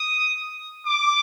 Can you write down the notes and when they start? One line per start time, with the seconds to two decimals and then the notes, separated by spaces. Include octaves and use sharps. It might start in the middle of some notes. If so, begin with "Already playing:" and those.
Already playing: D#6
0.86 D6